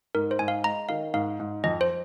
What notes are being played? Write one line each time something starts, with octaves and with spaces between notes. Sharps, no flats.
G#2 A#4
C5
G#2 G#5
F5
G#3 A#5
D#3 F5
G#2 F5
G#2
F2 D#5
C5